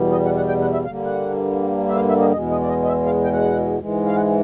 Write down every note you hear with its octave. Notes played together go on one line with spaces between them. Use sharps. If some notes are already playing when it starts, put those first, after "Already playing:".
Already playing: E2 B2 G3
D#5
F#5
F#5
G5
F#5
E5
G2 D3 G3 A#3 F5
F#5
E5
F5
E5
D#5
E2 B2 G#3 D#5
D#5
D5
D#5
D#5
E5
F5
G5
F#5
G#2 E3 G#3
F5
F#5